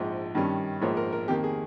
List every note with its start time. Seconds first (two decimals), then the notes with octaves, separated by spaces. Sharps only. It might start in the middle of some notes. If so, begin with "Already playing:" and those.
Already playing: A#1 G#2 F3
0.35 G2 D#3 G3 C#4
0.81 A#1 G#2 F3 A#3 C#5
0.97 A#4
1.12 A#4
1.28 F2 D#3 A#3 G4
1.44 G#4